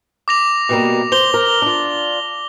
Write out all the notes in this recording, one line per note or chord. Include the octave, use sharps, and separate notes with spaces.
D6 A#6 F7
B2 G3 A#3
C5 F7 G7
A#4
D4 F4